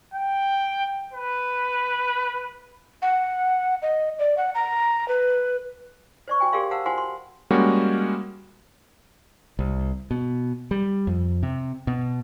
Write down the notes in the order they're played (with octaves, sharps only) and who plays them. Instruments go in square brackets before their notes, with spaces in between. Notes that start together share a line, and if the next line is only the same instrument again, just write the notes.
[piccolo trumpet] G5
B4
[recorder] F#5
D#5
D5
F#5
A#5
B4
[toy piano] C5 D5 C#6
F#4 G5 G#5
G4 G#4 A#4 D5 F5 C6
C5 F5 F#5 A5 A#5 E6
F4 F#4 C5 F#5 G#5 C6
C6
[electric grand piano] G3 G#3 A#3 C#4 F#4
[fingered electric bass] C2
B2
G3
F2
C3
B2